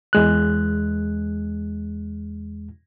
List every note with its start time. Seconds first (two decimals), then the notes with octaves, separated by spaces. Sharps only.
0.13 E2 G#3 F#6